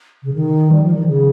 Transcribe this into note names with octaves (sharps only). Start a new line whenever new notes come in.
C#3
D#3
G3
F3
D#3
C#3